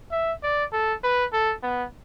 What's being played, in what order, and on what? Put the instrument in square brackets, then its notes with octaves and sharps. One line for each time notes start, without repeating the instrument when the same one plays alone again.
[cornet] E5
D5
A4
B4
A4
B3